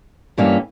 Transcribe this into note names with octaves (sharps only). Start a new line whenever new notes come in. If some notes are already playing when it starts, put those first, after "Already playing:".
G2 E3 A#3 C#4 G4